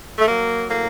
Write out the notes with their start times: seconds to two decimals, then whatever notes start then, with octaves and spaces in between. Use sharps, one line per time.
0.19 A3
0.28 F#3 A#3
0.70 A2 A#3